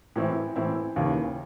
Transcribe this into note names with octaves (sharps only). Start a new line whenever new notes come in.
A2 E3 C4 E4
A2 E3 C4 E4
D#2 C#3 E3